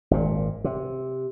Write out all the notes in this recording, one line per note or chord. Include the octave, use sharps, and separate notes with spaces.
G#1 A#2
C3